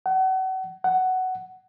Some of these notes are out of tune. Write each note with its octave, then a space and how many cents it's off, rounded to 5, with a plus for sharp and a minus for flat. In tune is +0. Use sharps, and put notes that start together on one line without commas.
F#5 +35
F#5 +10